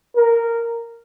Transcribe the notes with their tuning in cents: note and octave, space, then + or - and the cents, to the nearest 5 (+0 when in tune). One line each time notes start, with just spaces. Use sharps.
A#4 -10